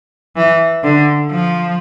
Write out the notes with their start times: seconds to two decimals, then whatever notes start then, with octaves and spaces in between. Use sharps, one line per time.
0.36 E3
0.84 D3
1.31 F3